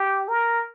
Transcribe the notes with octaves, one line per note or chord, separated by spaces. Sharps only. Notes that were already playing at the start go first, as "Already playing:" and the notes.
Already playing: G4
A#4